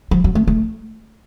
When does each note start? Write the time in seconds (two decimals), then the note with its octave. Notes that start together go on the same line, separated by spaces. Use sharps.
0.11 F3
0.24 F#3
0.35 A3
0.48 A3